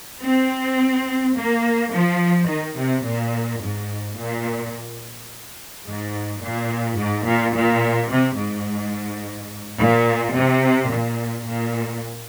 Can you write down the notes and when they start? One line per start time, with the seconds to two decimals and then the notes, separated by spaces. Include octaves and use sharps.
0.22 C4
1.35 A#3
1.91 F3
2.47 D#3
2.76 C3
3.04 A#2
3.60 G#2
4.16 A#2
5.85 G#2
6.42 A#2
6.97 G#2
7.25 A#2
7.53 A#2
8.10 C3
8.38 G#2
9.78 A#2
10.35 C3
10.90 A#2
11.48 A#2